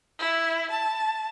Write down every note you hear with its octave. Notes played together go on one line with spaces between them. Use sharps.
E4
A5